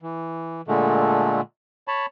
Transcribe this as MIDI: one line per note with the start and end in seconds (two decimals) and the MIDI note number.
0.02 0.61 52
0.68 1.41 46
0.68 1.41 50
0.68 1.41 56
0.68 1.41 57
1.88 2.06 73
1.88 2.06 81
1.88 2.06 83